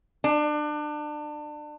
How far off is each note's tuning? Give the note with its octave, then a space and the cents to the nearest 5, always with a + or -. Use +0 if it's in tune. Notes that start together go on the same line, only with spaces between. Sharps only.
D4 +30